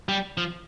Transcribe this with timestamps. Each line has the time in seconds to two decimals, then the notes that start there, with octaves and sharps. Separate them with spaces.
0.09 G3
0.37 F3